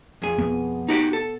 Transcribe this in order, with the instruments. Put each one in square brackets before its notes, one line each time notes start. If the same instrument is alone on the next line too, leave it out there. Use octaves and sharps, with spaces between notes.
[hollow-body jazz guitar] F2 G#4
[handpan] B3
[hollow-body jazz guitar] D#4 F#4 G4
A4